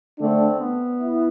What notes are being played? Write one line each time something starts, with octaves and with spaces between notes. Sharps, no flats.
D3 A3 C4 D4
B3
E4